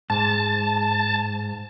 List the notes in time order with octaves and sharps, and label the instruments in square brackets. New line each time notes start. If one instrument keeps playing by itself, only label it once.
[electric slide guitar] G#2 [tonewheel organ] A5